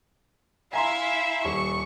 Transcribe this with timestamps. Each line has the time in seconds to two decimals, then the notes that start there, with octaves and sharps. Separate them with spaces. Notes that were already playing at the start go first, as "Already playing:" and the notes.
0.73 E4 E5 F5 G#5 A#5 C6
1.45 D#1 C#6